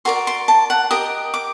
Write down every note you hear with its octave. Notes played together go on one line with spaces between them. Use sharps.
F#4 A#4 D5 C6
C6
A5
F#5
G4 A#4 D#5 D#6
D6